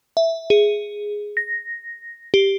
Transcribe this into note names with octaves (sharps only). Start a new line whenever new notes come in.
E5
G#4
A#6
G4